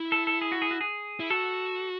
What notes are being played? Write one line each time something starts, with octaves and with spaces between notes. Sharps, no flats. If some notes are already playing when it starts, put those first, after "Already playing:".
Already playing: E4
A4
A4
G#4
F#4
G#4
F#4
G#4
E4
F#4 A4